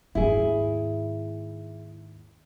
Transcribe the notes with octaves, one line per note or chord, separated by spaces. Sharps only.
D#2 G#2 E4 G#4